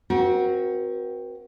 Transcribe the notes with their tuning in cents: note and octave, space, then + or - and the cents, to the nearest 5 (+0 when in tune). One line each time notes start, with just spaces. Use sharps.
C4 +0 F#4 +0 A#4 +40